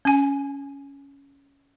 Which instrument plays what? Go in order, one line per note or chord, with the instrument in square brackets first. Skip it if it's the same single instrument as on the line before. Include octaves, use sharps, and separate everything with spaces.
[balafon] C#4 G#5